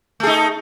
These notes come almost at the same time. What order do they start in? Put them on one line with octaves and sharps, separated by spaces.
A3 G#4 D#4